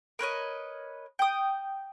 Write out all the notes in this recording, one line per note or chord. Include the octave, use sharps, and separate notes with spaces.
A#4 B4 C#5 D#5
G5 D#6